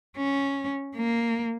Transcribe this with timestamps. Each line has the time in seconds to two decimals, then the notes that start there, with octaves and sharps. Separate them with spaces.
0.17 C#4
0.96 A#3